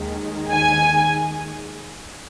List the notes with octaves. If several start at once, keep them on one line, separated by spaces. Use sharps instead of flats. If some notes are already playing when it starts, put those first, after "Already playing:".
Already playing: D#2 D#3 G#3
G#5